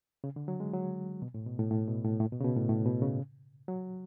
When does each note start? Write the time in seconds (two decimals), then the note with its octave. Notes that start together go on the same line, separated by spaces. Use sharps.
0.24 C#3
0.36 D3
0.48 F#3
0.60 G#3
0.73 F#3
1.22 B2
1.34 A2
1.47 B2
1.59 A2
1.71 A2
1.88 B2
2.05 A2
2.20 A2
2.32 B2
2.40 C#3
2.45 B2
2.57 A2
2.69 A2
2.86 B2
3.02 C#3
3.68 F#3